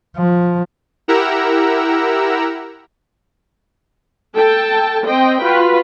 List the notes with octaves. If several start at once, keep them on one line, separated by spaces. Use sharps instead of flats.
F3
E4 G4 A#4 F#5 A#5 E6
A4 G5 A5
C4 C5 D#5 G5
F4 F#4 B4